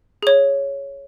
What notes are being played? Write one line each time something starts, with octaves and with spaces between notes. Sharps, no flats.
G#4 C#5